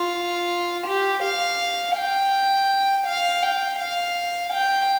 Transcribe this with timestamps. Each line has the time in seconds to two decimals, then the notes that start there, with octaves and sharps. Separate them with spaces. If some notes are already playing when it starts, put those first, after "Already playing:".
Already playing: F4
0.86 G4
1.23 F5
1.96 G5
3.06 F5
3.42 G5
3.79 F5
4.53 G5